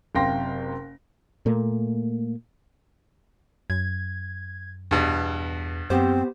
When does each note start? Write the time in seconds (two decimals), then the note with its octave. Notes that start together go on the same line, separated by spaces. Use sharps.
0.15 F#1 C3 F5 G5 C6 A#6
1.46 A#2 A3 A#3
3.70 F#2 G#6
4.91 E2 G2 B2
5.90 F#2 B3 C4 G4 C5